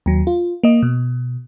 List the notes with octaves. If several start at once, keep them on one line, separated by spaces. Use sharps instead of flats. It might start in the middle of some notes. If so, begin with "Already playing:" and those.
D#2 F#3
F4
A#3 D#5
B2